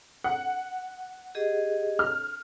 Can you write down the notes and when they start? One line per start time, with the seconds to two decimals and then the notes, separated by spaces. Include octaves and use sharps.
0.24 F#5
1.35 G4 G#4 D#5
1.99 F6